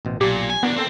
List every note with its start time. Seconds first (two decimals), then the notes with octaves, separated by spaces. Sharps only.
0.05 A1 B2 C5
0.21 B1 A#2 G4 A#5
0.50 G#5
0.63 E2 B3 D4 F#4 A#4 F#5
0.76 A#3 C4 A4 G5